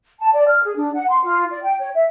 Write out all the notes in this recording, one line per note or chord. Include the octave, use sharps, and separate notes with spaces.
A5
D5
F6
G#4
D4
F#5
C6
F4
D5
G5
C#5
E5